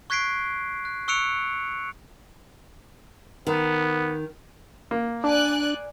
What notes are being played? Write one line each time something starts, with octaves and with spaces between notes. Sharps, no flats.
C#6 F#6 G#6 B6 C7 D7
F#6
C#6 E6 F#6 C#7 D7 F7
D#3 B3
A#3
D4 D5 G#5 F#6